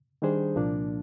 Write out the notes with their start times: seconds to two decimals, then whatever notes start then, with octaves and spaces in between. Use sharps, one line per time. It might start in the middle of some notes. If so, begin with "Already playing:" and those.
0.22 D#3 G3 D4 G#4 C5
0.56 C2 A#2 F3 A#3 D4